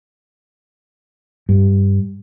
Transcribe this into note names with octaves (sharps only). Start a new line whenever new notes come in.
G2